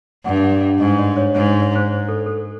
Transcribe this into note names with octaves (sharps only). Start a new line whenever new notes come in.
G2 F#5
F5
G#2 D#5
D5
C#5
G#2 C#5
C#5
C5
A4
A4